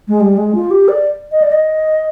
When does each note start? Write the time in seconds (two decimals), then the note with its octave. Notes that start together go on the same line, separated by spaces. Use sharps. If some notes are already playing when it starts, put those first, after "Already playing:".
0.08 G#3
0.21 G3
0.37 G#3
0.55 F4
0.71 G4
0.89 D5
1.32 D#5
1.42 D5
1.52 D#5